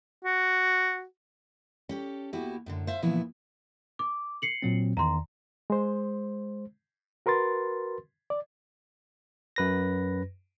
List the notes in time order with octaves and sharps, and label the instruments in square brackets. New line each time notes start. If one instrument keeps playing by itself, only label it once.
[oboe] F#4
[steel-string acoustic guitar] C#4 G4 A4
D#2 B3 E4 F#4 G4
F#2 A2 D3
C5 E5 F5
A#2 C#3 E3 F3 B3 E4
[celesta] D6
C7 C#7 F#7
[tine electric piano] A#2 F#3 C4
[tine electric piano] E2 D#3 [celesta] A#5 C6
[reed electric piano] G#3 C5
F#4 A#4 B4 C6 A6
D5
[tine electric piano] F#2 B4 A#6